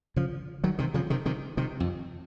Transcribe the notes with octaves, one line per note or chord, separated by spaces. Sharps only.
C#3 F3
D#3 F#3
C3 D#3
C#3 F3
C3 D#3
C3 D#3
C3 D#3
F2